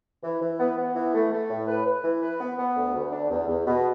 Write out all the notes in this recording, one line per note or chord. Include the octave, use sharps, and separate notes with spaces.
E3
E3
B3
B3
E3
A3
A3
A2
B4
B4
E3
B4
B3
B3
D2
D2
D4
E2
E2
B2